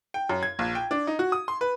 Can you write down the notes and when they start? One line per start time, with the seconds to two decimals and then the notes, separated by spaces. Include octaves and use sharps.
0.14 G5
0.29 F#2
0.43 G#6
0.59 A#1
0.75 G5
0.91 D4
1.07 D#4
1.19 F#4
1.32 D#6
1.48 C6
1.61 B4